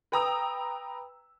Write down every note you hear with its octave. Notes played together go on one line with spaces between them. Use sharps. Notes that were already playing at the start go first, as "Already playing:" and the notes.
B4 G5 A#5 D#6 E6